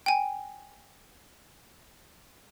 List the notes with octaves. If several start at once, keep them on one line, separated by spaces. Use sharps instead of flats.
G5 G#5